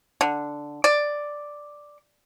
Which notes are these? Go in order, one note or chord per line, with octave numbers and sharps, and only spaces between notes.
D3
D5